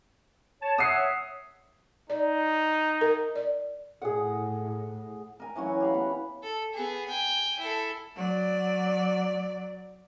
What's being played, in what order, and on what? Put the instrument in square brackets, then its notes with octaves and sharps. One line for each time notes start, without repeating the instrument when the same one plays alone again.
[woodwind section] C#5 A5
[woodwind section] C#5 E5 F#5 [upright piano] D#6 C7
[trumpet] D#4 [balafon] D5
[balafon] A#4
D5
[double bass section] A2 [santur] G#4 F#5
[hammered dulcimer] A#4 G#5
E3 F#3 C#4 F#4
G4 F5 B5
B3 F#5
[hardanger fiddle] A4
B3 G#4
G5 G#5
E4 A4
[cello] F#3 D5